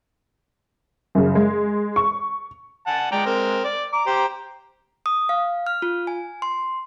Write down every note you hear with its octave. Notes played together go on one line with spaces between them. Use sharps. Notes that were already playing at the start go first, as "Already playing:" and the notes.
F#2 C#3
G#3
C#6
F#5 G#5 A5
G#3 D5 G5 A#5
C4 A#4
D5
A#5 D6
G4 C5
D#6
F5
F6
F4
G#5
C6